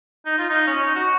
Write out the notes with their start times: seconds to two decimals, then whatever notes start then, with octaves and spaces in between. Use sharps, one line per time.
0.26 D#4
0.38 F4
0.50 D#4
0.67 C#4
0.82 D#4
0.95 F#4